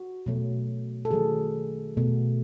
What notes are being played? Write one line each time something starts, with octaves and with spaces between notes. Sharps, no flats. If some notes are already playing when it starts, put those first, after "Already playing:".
Already playing: F#4
B2 F#3 A3
A4
D#3 F#3 A3 G#4
B2 A3